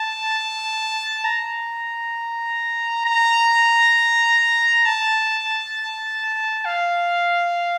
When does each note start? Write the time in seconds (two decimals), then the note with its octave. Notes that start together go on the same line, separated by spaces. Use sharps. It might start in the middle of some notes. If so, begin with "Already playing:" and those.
Already playing: A5
1.25 A#5
3.05 A#5
4.86 A5
6.65 F5